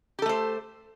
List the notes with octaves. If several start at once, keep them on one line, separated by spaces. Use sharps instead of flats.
A3 G4 A4 C5